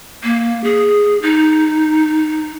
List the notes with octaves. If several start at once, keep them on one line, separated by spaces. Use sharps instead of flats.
A#3
G#4
D#4